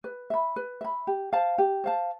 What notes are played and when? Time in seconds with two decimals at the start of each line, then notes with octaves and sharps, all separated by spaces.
0.04 B4
0.30 E5 B5
0.56 B4
0.81 E5 B5
1.07 G4
1.33 C5 F5 A5
1.58 G4
1.84 C5 F5 A5